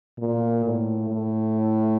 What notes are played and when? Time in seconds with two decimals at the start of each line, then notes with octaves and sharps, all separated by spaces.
0.18 A#2
0.64 A2
1.09 A2